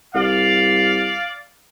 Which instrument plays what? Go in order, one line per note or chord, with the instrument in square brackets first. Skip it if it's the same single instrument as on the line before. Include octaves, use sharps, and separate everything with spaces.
[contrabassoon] C2 [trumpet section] D5 F5